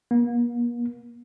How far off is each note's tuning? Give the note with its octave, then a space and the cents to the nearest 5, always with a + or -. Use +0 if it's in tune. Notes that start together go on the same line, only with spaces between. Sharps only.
A#3 +45